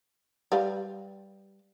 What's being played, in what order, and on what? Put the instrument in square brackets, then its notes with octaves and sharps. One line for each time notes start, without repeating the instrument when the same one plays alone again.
[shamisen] G3 B4 F5